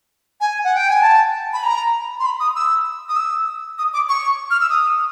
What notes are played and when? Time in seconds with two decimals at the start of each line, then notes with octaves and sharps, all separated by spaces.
0.41 G#5
0.64 F#5
0.76 G5
0.89 G#5
1.02 A5
1.53 B5
1.63 A#5
2.20 C6
2.25 B5
2.40 D#6
2.56 E6
3.09 D#6
3.16 E6
3.78 D#6
3.94 D6
4.09 C#6
4.51 F6
4.61 E6
4.69 D#6